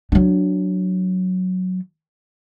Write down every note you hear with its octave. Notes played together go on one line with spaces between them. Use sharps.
F#3 D4